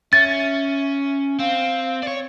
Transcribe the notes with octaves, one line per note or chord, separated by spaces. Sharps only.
C#4 E5 A6
C4 F5
C#5 D5